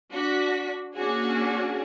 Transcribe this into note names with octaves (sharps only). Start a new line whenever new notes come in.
D4 F#4 B6
A#3 C#4 D4 F#4 G#4